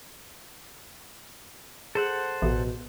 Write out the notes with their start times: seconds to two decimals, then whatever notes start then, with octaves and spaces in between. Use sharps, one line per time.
1.95 G#4 A4 C5 F#5
2.42 A1 B2